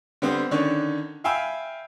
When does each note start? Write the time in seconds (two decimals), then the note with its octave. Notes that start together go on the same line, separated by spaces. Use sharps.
0.22 D3 G3 B3 C4
0.51 D3 D#3 C#4 D4 C#5
1.24 E5 F5 G5 G#5 B5 E6